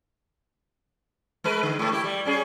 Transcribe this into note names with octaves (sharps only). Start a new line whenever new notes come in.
G#3 A#4 B4
D3
G#2 A3
E4 G4
G3
G3 C#4 G#4